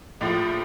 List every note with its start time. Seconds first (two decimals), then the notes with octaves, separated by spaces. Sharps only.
0.21 A#1 A2 F3 A6